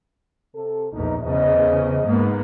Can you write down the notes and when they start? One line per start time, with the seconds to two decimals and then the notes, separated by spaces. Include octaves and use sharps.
0.55 C3 A4
0.93 A#1 E2 D#4
1.23 E2 C#3 C5 D#5
2.04 G#2 A#3 B3